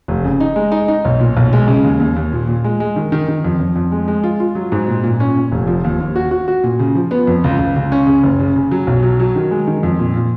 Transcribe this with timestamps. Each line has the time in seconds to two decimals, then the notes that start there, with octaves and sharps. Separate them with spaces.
0.08 F1
0.24 C#3
0.40 D#4
0.56 G#3
0.72 D#4
0.88 D#4
1.05 B1
1.20 A#2
1.37 B1
1.53 G#3
1.68 C#3
1.84 D#2
2.00 D#2
2.16 D#2
2.32 A#2
2.48 A#2
2.64 G#3
2.80 G#3
2.96 D#3
3.12 D#3
3.28 D#3
3.45 F2
3.60 F2
3.76 F2
3.92 G#3
4.08 G#3
4.24 F4
4.40 F4
4.55 F#3
4.72 G#2
4.88 A#2
5.04 A#2
5.20 C#4
5.36 A#2
5.52 F1
5.67 F3
5.84 D#2
6.00 D#2
6.16 F#4
6.31 F#4
6.48 F#4
6.64 A#2
6.79 C#3
6.95 F3
7.11 B3
7.27 F2
7.44 C#2
7.59 C#2
7.76 C#2
7.92 C#4
8.07 C#3
8.23 F#1
8.40 C#3
8.56 C#3
8.71 F#3
8.87 B1
9.03 F#3
9.20 F#3
9.36 D#3
9.51 G#3
9.67 D#3
9.83 F2
9.99 A#2
10.16 A#2